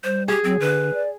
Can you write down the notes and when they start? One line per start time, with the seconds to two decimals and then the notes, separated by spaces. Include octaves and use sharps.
0.04 G3 C5
0.28 G4 G#4
0.44 F#3 C4
0.60 D3 B4
0.94 D5